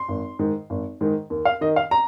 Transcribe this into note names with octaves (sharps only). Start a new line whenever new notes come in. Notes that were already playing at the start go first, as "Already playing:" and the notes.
Already playing: C6
G#1
G#2 D#3
G#1
G#2 D#3
D#2
F5
D#3 D#5
F5
A#5